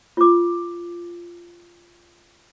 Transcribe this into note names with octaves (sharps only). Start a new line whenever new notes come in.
F4 D6